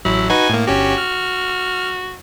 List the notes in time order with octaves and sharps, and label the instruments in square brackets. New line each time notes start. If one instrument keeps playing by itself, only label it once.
[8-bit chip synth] A1 F#3 [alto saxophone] E4
[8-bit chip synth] D#4 F#4 B4 [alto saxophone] G#5
[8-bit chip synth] A2 A#3
[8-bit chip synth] G1 C#4 G4 [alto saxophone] F#4
[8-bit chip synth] F6